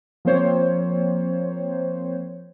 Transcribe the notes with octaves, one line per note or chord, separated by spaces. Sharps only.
F3 A#3 C4 C5 C#5